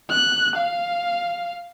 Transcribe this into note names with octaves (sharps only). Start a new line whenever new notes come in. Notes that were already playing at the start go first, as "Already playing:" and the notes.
F#6
F5